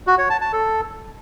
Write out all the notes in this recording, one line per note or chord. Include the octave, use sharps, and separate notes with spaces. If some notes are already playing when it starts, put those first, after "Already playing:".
F#4
C#5
A5
A5
A4